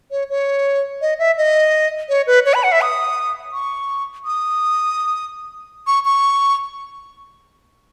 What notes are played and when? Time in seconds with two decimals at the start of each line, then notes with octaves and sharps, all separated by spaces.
0.11 C#5
0.30 C#5
1.01 D#5
1.19 E5
1.38 D#5
2.09 C#5
2.27 B4
2.46 C#5
2.54 B5
2.63 F#5
2.72 E5
2.81 D#6
3.53 C#6
4.25 D#6
5.87 C#6
6.05 C#6